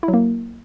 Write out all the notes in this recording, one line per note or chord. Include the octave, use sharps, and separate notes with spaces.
E4
F#3
A#3